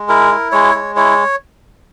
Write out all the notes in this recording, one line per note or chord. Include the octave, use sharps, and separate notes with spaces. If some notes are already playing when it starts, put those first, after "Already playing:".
Already playing: G#3
E4 A#4
E4
G#3 C#5
G#3
E4 C#5